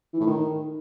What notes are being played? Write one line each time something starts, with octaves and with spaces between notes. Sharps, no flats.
E3
A2
D#3